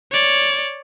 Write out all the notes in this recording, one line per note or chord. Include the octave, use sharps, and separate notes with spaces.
C#5 D5